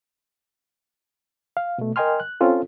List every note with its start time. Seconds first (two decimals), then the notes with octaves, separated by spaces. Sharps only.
1.57 F5
1.78 B2 A3
1.96 A#4 D#5 G5 G#5 C6 F6
2.20 F#6
2.41 C4 C#4 F4 A4